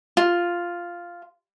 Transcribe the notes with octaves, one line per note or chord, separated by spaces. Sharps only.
F4